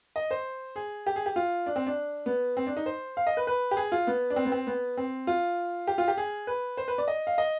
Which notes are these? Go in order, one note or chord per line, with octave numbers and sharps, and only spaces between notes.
D#5
C5
G#4
G4
G#4
G4
F4
D4
C4
D4
B3
C4
D4
D#4
C5
F5
D#5
B4
B4
G4
G#4
F4
B3
D4
C4
B3
C4
B3
C4
F4
G4
F4
G4
G#4
B4
C5
B4
D5
D#5
F5
D#5